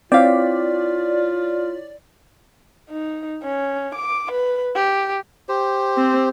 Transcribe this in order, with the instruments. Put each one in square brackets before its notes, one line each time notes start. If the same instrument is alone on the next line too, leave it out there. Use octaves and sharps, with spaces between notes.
[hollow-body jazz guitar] C4 F5 [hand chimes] E4 C#5 B6 [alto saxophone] F4 [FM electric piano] D5
[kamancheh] D#4
C#4
D6
B4
G4
[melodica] G4 C5
[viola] C4